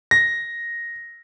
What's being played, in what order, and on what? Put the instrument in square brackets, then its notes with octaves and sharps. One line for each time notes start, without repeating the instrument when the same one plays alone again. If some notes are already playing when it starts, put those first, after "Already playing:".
[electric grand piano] A#6